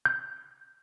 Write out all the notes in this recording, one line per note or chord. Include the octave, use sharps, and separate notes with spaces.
G6